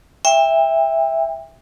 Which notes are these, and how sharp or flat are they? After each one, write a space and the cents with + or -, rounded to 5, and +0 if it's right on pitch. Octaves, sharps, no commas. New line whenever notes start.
E5 +0 G5 +35